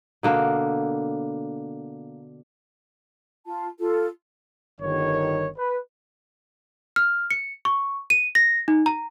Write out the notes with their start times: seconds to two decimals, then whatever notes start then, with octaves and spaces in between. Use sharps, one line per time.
0.23 B2 D3 A#3
3.46 F4 A5
3.79 F4 A4
4.81 G1 D#3 C#5
5.57 B4
6.96 F6
7.31 C#7
7.65 C#6
8.10 D#7
8.35 A#6
8.68 D#4
8.86 A#5